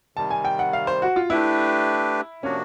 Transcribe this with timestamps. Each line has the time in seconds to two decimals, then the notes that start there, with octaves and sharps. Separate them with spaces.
0.16 C3 D#3 G3 A5
0.31 G#5
0.45 G5
0.59 F#5
0.73 F5
0.87 C5
1.02 F#4
1.16 F4
1.30 A3 D4 E4 G4 B4
2.43 C3 F3 A#3 C#4 D4 F#4